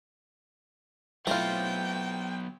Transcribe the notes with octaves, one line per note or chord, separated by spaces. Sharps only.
F#3 A3 B3 C4 E4 F4 G5